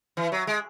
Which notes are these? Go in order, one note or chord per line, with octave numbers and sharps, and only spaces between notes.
E3
F#3
G#3